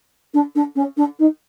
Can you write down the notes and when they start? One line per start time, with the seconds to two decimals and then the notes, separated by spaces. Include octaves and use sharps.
0.34 D4
0.55 D4
0.75 C#4
0.97 D4
1.19 D#4